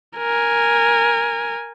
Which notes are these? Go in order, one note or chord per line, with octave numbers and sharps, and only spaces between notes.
A#4 G#5